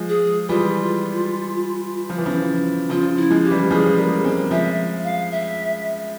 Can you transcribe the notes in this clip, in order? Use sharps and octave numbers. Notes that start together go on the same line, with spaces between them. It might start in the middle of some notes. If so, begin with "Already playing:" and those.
Already playing: F3 G#3
G#4
E3 G3 F4
F3
E3
C#3 F3
C#3 F3 F4
E4
F3 G#3
G4
E3 G3
F3 G#3 G#4
G3 A#3
G#3 C4
F3 G#3 E5
F5
E5